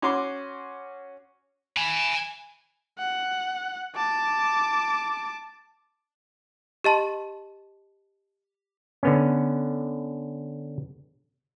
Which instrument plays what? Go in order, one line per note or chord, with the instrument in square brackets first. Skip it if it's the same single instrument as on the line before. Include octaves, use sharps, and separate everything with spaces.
[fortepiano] C#4 F#4 C6 D6
[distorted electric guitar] G#5 B5
[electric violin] F#5
A5 D6
[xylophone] G4 D#5 A5 C6
[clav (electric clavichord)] D3 B3 C#4